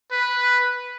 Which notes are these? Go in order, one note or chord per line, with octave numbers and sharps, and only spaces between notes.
B4